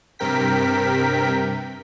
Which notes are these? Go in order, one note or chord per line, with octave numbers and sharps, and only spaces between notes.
G2 C3 A#4 G5 B6